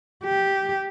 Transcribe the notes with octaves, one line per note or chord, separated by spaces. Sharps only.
G4